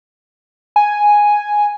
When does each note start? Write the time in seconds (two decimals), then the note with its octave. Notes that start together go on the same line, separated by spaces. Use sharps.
0.76 G#5